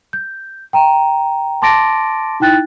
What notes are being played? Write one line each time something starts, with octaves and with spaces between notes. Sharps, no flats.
G6
G5 A#5
A5 C6 D6 A6 A#6 D7
D#4 E4 G5 F#6 A6